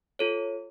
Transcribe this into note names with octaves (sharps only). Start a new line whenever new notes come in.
F4 A4 C#5